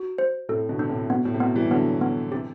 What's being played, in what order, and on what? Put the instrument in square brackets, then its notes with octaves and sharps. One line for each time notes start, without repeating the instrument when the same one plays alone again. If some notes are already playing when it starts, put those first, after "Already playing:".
Already playing: [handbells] F#4
C5
[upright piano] A2 C3 [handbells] A4
[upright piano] B2 D3
[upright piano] D3 [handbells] D4
[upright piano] A2 C3
[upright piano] B2 [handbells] B3
[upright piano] A2
C3
[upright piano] B2 [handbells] B3
[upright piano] E3 G3
[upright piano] D3 F#3 [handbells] B3
[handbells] B3
[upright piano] C3 E3 [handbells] G4